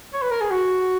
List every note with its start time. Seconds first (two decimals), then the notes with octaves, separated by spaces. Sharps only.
0.14 C#5
0.22 B4
0.31 A#4
0.41 G#4
0.51 F#4